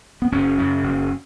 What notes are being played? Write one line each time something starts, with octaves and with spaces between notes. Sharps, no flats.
B3
F#1 C#4
F#2 C#3
F#1